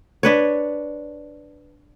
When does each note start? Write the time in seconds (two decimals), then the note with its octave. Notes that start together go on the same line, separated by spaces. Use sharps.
0.23 D4 B4 C#5